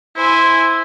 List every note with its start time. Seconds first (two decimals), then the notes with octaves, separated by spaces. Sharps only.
0.16 E4 C5 G#5